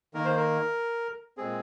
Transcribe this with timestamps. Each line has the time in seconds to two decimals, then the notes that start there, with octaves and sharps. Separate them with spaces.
0.14 D#3 A#3 A#4
0.25 C5
0.37 A#4
1.37 A#2 G#3 C4 G#4